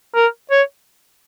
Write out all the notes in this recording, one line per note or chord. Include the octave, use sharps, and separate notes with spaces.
A#4
C#5